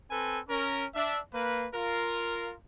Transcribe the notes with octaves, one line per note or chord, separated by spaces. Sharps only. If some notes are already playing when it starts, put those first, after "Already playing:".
C4 A4 B4 G#5
C#4 A#4
D4 E5
A#3 B4
F4 A#4